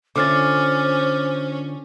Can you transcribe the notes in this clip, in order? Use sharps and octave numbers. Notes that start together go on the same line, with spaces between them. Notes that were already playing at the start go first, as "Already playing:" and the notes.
D3 C#4 F4 C5 D6 F6 A6